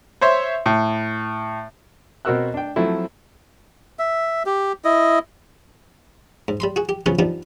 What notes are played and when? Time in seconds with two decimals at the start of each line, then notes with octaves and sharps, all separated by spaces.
0.21 C5 C#5 E5 C6
0.66 A2
2.25 B2 C4 F#4 A#4 E6 F#6
2.54 D4 G5
2.76 F3 F#3 A3 C4 E4
3.99 E5
4.46 G4
4.84 E4 D#5
6.48 G#2
6.60 G3 B5 C6
6.76 F#4 G#4
6.89 G4
7.06 C#3 F3 F#3 B3 C#4
7.19 F3 G3 B3 D4 D#4